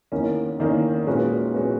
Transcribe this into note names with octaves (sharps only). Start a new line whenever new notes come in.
E2 D#3 A#3 C#4
E2 D#3 A#3 C#4
A#2 G#3 C#4 F#4 B4
A#2 G#3 C#4 F#4 B4